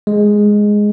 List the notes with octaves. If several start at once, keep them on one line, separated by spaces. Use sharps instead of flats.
G#3